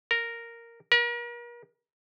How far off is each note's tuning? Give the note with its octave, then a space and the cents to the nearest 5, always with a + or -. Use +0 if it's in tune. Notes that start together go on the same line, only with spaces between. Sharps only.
A#4 -5
A#4 +40